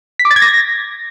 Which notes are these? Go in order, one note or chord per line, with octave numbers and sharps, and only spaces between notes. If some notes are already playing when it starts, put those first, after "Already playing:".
B6
D6
A6
G#6
A#6